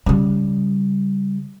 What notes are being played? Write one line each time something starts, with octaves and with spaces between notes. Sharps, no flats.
C#3 G3